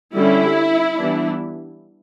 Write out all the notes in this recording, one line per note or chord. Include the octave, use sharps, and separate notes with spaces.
D3 G3 C#4 E4
E3 G3 B3 D4